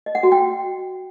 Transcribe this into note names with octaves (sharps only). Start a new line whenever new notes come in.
D#5
F#5
F#4
G5